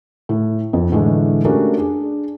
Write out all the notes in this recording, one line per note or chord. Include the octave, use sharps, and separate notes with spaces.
A2
F2
A2 D3 E3 G#3 A3
A3 C#4 D4 F#4 G4 A#4
D4 G#4